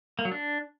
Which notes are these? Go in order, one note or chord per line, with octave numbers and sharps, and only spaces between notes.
A#3
F#3
D4